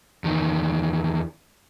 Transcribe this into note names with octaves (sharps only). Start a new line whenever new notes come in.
E2 D#3